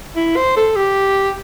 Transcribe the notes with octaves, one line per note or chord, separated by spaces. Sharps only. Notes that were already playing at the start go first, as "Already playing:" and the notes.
E4
C5
A4
G4